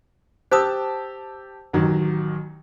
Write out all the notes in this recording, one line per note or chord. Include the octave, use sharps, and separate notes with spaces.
G4 C5 A5 D#6 E6
A1 D#3 F#3